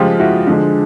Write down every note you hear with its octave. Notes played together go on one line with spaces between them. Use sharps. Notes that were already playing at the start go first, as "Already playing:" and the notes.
Already playing: C#3 F3 G#3 F4 G4
E4 F#4
D3 F3 G#3